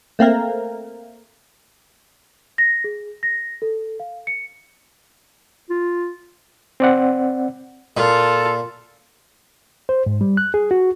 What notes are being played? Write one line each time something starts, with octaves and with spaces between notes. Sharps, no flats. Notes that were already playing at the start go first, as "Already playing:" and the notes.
A3 A#3 C4 A#4
A#6
G#4
A#6
A4
F5
C#7
F4
C4 D5 F#5
A#2 F4 A4
C5
G#2
G3
F#6
G#4
F#4